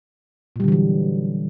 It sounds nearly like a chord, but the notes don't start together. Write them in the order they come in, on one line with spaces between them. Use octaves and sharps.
A#2 G3 D3 E3 F#3